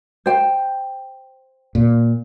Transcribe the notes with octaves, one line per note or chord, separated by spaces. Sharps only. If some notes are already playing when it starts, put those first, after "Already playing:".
C5 G5
A#2